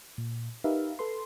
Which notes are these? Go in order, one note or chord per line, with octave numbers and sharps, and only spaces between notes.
A#2
D#4 G4 A#4 B4 E5 F5
A4 B4 C6